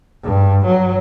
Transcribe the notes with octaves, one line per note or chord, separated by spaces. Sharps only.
G2
F#3